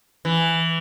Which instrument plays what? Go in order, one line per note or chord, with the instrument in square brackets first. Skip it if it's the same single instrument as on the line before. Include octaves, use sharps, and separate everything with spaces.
[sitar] E3